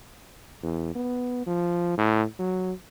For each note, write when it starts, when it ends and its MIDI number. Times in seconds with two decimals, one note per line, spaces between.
0.63 0.92 40
0.95 1.43 59
1.47 1.97 53
1.98 2.24 45
2.39 2.73 54